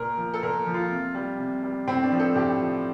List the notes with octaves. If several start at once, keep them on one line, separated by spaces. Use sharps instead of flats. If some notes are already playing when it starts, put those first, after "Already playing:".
Already playing: A#2 A#4
F3
A4
A#2 A#4
F3
F4
C3
G3
C3
G3
A2 C4
D4
F3
A4
A2 G4
F3